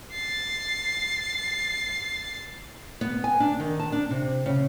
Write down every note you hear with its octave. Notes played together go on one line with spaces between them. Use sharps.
A6 C7
B3
G#5
D4
D#3
A5
D4
C3
C#3